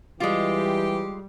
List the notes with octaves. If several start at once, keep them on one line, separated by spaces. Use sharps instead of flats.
E3 G3 G#3 F4 G4